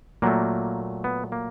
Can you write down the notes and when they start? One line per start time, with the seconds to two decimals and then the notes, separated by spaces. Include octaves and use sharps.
0.22 A#2 F#3 A3 A#3
1.04 B3
1.32 A#3